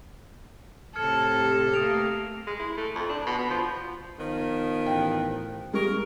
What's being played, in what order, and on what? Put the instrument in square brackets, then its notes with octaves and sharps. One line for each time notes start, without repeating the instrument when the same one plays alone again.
[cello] A2 C3 [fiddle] A4 [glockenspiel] F6 G#6 C#7
[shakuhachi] G4
[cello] A3 A#3 [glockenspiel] D#6 D7 F7
[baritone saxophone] G#3
E4
A3
F2
D4
B2
B2
F3
[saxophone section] D#3 F3 B3
[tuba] A1 [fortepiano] G5
[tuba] G3 [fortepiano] G#3 C#6 [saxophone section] A#4